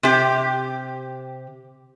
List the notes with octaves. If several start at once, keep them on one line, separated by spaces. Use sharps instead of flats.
C3 G4